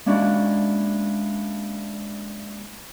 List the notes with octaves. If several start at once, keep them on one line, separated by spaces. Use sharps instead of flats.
G#3 A#3 C#4 D4 E4 F#4